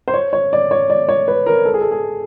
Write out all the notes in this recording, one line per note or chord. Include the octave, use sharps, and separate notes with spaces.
C5
C#5
C#5
D5
C#5
D5
C#5
B4
A#4
A4
G#4
A4
G#4